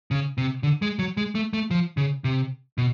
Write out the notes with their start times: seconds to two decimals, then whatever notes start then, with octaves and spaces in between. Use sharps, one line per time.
0.11 C#3
0.38 C3
0.63 D3
0.82 G#3
0.99 F#3
1.17 G#3
1.35 A3
1.53 A3
1.71 F3
1.97 C#3
2.24 C3
2.78 B2